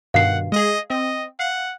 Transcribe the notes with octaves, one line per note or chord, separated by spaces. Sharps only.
G2 B2 D#3 F5 F#5 C7
G#3 G#4 D#5
C4 D#5
F5 F#5